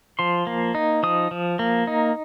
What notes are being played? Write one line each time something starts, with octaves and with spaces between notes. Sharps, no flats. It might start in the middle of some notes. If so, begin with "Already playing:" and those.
F3 C6
A#3
D#4
F3 D#6
F3
A#3
D#4